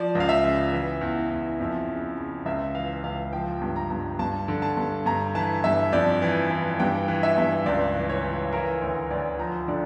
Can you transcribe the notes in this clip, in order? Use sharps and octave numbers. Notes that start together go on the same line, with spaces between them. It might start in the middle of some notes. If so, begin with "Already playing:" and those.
Already playing: F3 D5
C#2
F5
E5
C#3
E3
E2
E2
F2
C#3
C#3
C#2 E5
E3 F5
C#2 F5
F3 G5
G2
A#5
G2
G2 A5
D3
A5
G2
G2 A#5
E3 A5
G2 E5
F2 D5
E3
E3
G2 G5
E3
E5
G2
C#2 D5
E3
C#5
E3
E3 A#4
D2 C#5
D2 D5
F3 A#5
D3 D5